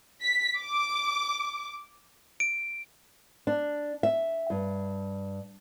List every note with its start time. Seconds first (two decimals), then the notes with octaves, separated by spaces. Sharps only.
0.23 B6
0.58 D6
2.40 D7
3.47 D4
4.03 E5
4.50 G2